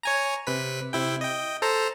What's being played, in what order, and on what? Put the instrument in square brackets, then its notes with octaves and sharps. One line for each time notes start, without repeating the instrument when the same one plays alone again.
[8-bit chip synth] C#5 G#5 A#5
C3 B4 B6
C3 E4 G5
D#5 G5
A4 C5 A#5